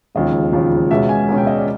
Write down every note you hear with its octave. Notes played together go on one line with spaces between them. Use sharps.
E1 D#2 C#3 F3 D#5
E1 D#2 C#3 F3
C#2 B2 G#3 C#4 E5
G#5
C#2 B2 G#3 C#4
G5
D#5
D5